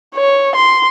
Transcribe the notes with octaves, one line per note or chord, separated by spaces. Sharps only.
C#5
C6